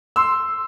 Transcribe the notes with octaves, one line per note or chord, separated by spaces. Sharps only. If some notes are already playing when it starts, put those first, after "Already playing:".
C6 E6